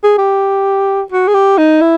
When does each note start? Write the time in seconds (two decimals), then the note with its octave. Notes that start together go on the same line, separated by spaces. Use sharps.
0.04 G#4
0.18 G4
1.12 F#4
1.28 G#4
1.34 G4
1.58 D#4
1.81 E4